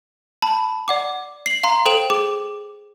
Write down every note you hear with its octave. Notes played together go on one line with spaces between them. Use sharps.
A5 B5
D5 F#5 D6
C7 F#7
F5 A#5 C6
A4 C5 G5 D7 E7 F#7
G#4 D6